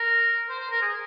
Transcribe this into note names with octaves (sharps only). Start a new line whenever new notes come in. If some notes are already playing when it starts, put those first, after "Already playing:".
Already playing: A#4
C5
C5
A#4
G#4